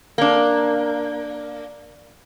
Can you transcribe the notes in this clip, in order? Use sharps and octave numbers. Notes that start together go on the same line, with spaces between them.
A#3 D4